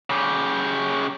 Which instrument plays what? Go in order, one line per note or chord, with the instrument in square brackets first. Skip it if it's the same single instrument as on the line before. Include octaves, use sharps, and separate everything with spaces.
[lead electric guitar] C#3 G4